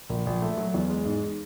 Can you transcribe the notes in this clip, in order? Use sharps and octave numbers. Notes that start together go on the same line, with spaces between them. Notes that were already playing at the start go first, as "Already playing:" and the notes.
A#1
A#1
A3
F#3
E2
G#3
G#2